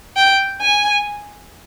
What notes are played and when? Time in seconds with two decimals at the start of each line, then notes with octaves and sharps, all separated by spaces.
0.16 G5
0.62 G#5